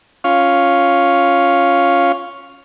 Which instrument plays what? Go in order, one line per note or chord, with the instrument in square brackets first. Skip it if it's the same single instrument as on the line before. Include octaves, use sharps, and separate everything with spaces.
[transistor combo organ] C#4 F4 F5 C#6